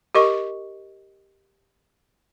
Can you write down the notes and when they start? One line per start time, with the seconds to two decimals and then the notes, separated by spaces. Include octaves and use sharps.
0.15 G4 A#4 D#5 C#6